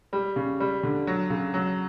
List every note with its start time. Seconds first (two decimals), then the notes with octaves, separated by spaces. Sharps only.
0.13 G3
0.36 C#3
0.60 G3
0.83 D3
1.07 F#3
1.30 C#3
1.54 F#3